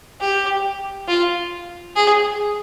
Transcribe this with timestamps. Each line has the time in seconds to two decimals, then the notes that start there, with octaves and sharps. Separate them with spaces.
0.20 G4
1.08 F4
1.96 G#4